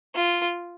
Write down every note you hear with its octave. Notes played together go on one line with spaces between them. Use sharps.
F4